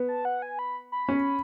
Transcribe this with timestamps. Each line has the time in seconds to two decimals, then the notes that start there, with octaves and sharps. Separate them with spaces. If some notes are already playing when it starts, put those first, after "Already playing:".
Already playing: B3
0.08 A5
0.25 F#5
0.42 G#5
0.59 B5
0.92 B5
1.09 C#4